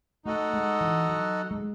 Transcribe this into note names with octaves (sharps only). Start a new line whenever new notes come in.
A3 D#4 F#4 A4 D#5 F#5
G#3
E3
F#3
G#3